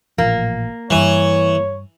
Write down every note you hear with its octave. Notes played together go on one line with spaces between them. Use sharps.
A1 A#2 F3 A#3
G2 E3 G3 C#5